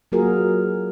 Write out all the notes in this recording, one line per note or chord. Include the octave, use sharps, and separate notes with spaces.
F#3 A#3 F4 F#4 G#4 A#4